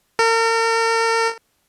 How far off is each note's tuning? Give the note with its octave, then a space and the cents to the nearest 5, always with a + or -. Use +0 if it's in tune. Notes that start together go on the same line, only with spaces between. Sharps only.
A#4 -40